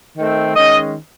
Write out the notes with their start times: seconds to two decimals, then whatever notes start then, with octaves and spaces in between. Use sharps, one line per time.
0.17 D#3 A3 C4
0.55 D#3 G#3 C#4 D#5